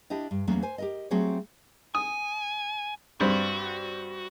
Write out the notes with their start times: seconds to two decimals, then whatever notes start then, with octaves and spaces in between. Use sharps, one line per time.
0.10 D4 E4 G4 D#5
0.31 G2
0.48 E2 F#3 A3 A#3 C#4
0.63 C5 G#5
0.78 G4 A#4 D#5
1.11 F#3 A3 C4 F#4 G#4 C#5
1.95 G#5 D#6
3.21 G2 G3 C4 F#4